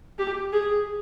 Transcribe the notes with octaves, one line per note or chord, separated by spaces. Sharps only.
G4
G#4